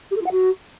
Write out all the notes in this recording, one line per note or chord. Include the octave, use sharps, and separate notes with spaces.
G4
A4
F4
F#5
F#4